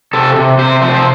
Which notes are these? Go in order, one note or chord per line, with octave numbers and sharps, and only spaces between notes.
C3 A4
C3
C3 C5
F3 C5
C5